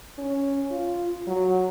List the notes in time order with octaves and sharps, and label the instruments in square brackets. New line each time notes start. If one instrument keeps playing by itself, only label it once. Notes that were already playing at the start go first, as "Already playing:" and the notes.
[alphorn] C#4
F4
F#3